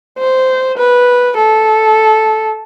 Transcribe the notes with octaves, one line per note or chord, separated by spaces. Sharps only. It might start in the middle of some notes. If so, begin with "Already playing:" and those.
C5
B4
A4